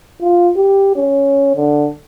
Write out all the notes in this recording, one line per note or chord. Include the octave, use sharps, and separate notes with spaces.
F4
G4
C#4
D3